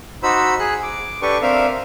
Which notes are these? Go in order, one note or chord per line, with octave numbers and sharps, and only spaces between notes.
D#4 F#4 C5 B5 E6
G#4 F#6
D6
D4 G4 A4 B4 C#6
C4 D4 A#4 E5 F5